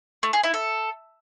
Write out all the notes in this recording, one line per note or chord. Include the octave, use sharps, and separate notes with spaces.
A3
G#4
E4
A4